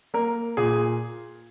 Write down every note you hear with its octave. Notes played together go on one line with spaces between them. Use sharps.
A#3 A#4
A#2 G#4